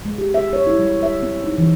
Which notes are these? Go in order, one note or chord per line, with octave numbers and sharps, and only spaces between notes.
G#3
G4
E5
C#5
E4
G3
E5
C4
D#4
E3